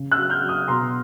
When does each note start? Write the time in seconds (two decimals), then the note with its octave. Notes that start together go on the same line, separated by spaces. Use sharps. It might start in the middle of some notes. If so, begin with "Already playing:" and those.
Already playing: C#3
0.12 E6 F#6
0.18 F#3
0.30 F6 G6
0.43 F#3
0.49 D#6 F6
0.67 B2 A#5 C6